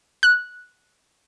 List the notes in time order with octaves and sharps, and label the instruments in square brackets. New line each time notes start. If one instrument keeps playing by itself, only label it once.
[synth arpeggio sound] F#6